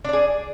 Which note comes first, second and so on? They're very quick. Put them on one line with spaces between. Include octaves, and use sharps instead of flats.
D4 D5 G#4